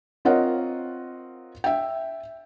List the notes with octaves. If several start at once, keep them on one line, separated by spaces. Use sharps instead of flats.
C4 F4 A#4 C#5 D#5 F#5
E5 G5